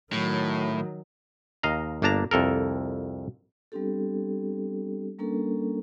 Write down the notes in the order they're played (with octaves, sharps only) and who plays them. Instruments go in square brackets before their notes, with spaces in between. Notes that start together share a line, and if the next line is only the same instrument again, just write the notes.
[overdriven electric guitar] A2 [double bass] D#3 F#3
[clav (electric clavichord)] D#2 D#5 F5 A#5
G1 A#3 D4 A5 A#5
C2 F2 A4 A#4
[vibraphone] G3 B3 C4 D4 G4 A4
G3 A#3 C#4 D4 A4 A#4